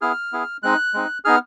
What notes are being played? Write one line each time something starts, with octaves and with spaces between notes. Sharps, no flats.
B3 E4 G#4 F6
B3 E4 G#4
G#3 C4 D#4 F#6
G#3 C4 D#4
B3 D#4 G#4 F6